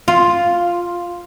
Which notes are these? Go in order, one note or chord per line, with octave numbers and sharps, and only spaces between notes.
F4